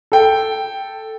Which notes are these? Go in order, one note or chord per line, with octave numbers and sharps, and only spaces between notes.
A4 G5